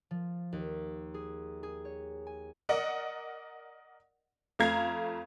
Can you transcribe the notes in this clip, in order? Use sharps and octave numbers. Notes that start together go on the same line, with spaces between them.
F3
D#2
G#4
G#4
C#5
G#5
A#4 D5 D#5 F#5
F2 A3 F5 A#5 G#6 C7